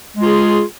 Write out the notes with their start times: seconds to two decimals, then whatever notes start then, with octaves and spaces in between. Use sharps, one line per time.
0.16 G#3
0.21 F4
0.25 G#4